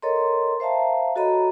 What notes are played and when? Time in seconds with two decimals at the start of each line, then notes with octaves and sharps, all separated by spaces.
0.02 A4 A#4 C#5 D#5 A#5 C6
0.60 C5 E5 F5 A5 A#5
1.16 F#4 A4 C#5 D#5 A#5 B5